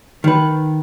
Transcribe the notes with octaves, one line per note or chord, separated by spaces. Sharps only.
D#3 B4